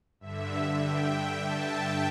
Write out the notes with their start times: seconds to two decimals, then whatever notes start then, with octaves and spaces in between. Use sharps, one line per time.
0.20 G2 D3 E5
0.80 G5
1.41 A5
1.70 G5